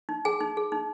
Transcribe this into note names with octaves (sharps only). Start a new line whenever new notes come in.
D#4
G#4 G#5
D#4
G#4
D#4